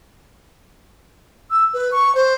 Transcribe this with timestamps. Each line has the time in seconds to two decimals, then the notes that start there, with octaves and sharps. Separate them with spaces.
1.50 E6
1.74 B4
1.92 C#6
2.15 C5